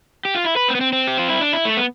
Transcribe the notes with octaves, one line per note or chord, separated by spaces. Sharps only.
G4
F4
E4
B4
C4
B3
C4
C4
G4
F4
E4
D4
E4
A3
B3